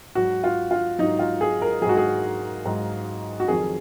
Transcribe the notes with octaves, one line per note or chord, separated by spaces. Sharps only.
G#2 F#3 F#4
F4
F4
G#2 F#3 D#4
F4
G#4
A#4
G#2 F#3 F#4 G#4
G#4
G#2 F#3
F#4
F2 D#3 F#3 G#4